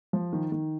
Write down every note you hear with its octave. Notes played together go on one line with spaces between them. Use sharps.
F3
D#3
D#3